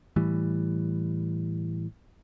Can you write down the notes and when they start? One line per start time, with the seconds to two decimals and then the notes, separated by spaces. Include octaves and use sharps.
0.16 A2 E3 G3